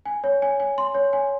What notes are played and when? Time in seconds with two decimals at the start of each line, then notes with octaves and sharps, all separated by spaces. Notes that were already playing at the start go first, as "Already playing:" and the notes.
0.06 G#5
0.24 C#5
0.42 G#5
0.60 G#5
0.78 C6
0.95 C#5
1.13 G#5